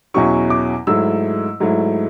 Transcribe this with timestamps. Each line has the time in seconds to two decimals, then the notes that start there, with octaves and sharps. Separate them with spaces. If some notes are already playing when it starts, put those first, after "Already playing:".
0.14 E2 B2 F#3 C#4 E4 C#6
0.50 D6
0.87 G#2 F#3 A3 E4 E6
1.60 G#2 F#3 A3 E4